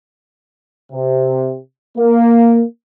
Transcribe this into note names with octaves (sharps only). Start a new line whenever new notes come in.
C3
A#3